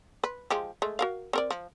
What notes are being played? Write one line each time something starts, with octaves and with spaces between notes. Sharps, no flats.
B4
F3 G#3 G4
G#3 A3
F#4 A#4 F5
C4 A#4 D5
F3